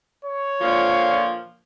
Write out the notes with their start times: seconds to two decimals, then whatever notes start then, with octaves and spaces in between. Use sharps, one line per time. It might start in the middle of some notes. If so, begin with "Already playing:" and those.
0.25 C#5
0.61 A#2 D3 F3